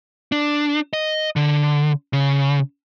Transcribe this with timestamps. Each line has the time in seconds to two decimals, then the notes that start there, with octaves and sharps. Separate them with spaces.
0.32 D4
0.93 D#5
1.36 D3
2.13 C#3